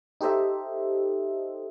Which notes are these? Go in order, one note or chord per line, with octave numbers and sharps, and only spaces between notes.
D#4 G4 A4 C5 D#5 E5